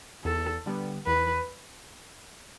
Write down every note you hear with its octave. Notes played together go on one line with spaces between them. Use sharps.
E2 A4
D3 G3 B3
E2 B4